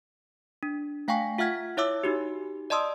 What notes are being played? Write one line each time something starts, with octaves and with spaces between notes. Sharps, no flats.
D4
A3 F5 G5 G#5 C#6 B6
F4 E5 F#5 F6 G#6 B6
E4 C#5 E5 D6 E6
D#4 F#4 G4
D5 D#5 A5 C6 D#6 E6